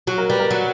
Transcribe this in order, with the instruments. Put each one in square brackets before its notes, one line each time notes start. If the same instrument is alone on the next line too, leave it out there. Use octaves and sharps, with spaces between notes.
[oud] F#3 [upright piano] F#4
[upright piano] A#4
[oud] G3 [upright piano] B4
[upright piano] A#4
[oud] F#3